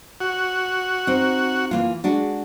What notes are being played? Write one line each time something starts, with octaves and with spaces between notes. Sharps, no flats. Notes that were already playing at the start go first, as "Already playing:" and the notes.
F#4
C4 D#4
E3 A#3 F4
G#3 D4 F#4